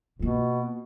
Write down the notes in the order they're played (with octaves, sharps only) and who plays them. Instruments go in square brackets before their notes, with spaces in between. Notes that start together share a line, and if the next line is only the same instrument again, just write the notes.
[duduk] B2 [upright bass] A#3 F4